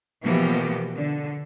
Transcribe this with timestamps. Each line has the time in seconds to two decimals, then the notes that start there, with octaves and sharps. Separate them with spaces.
0.25 B2 E3 F3 A#3 B3 G4
0.95 D3